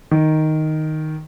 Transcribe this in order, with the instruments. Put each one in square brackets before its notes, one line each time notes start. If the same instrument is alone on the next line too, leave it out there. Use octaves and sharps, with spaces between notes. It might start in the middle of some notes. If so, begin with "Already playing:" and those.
[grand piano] D#3